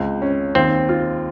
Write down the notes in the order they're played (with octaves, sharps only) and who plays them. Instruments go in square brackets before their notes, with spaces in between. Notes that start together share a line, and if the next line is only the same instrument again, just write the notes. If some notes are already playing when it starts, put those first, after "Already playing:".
Already playing: [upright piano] C#2 C4
C#4
[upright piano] D#2 [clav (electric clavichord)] C4
[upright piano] F4